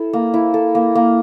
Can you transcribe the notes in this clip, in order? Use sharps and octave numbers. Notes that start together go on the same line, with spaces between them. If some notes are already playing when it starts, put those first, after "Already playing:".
Already playing: E4 A4
A#3
E4
A4
A#3
A#3